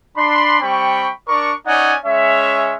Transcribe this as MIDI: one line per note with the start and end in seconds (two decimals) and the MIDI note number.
0.16 0.57 62
0.16 0.57 83
0.16 0.57 84
0.61 1.10 55
0.61 1.10 60
0.61 1.10 79
0.61 1.10 83
0.61 1.10 85
1.28 1.51 62
1.28 1.51 70
1.28 1.51 74
1.28 1.51 85
1.66 1.95 61
1.66 1.95 63
1.66 1.95 73
1.66 1.95 74
1.66 1.95 78
1.66 1.95 80
2.05 2.76 56
2.05 2.76 61
2.05 2.76 73
2.05 2.76 76